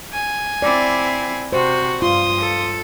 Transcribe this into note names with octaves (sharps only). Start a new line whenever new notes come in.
G#5
C4 E4 D5
C3 F#4 C5
G2 F4 C6 D#6
A4